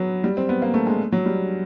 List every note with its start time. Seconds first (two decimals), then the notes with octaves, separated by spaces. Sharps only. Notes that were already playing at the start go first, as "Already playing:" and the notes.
Already playing: F#3 B3
0.24 G3
0.37 C4
0.49 B3
0.62 A#3
0.74 A3
0.87 G#3
1.12 F#3
1.26 G3